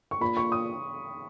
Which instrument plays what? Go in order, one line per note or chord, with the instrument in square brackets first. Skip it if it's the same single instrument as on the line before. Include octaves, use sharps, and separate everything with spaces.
[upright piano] C#6
[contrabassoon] A#2 [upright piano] B5
[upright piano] C#6
D#6